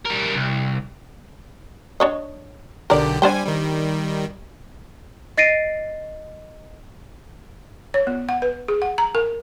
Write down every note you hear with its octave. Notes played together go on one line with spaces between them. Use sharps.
G3 A#4
C2
D4 C#5 D#5
B1 D3 G4 A#4 D5
G3 D4 C5 G5 G#5
D#3 G3
D#5 A6 A#6 C7 D7 D#7
C#5
B3
F#5
B4
G#4
F#5
A#5
A#4